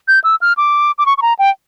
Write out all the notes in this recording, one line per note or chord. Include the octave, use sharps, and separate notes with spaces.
G6
E6
F6
D6
D6
C#6
C#6
A#5
G5